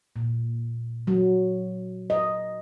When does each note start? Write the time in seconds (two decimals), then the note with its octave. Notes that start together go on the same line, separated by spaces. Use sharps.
0.16 A#2
1.07 F#3
2.10 D#5